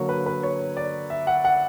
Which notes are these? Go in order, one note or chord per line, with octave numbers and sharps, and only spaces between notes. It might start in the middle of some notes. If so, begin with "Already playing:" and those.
Already playing: D3 F#3 A#3 C#5
B4
B4
C#5
D5
E5
F#5
F#5